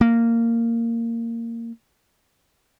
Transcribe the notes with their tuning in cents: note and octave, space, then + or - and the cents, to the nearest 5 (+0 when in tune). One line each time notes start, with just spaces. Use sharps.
A#3 -15